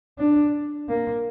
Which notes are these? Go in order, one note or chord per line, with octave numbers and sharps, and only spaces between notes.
D4
A#3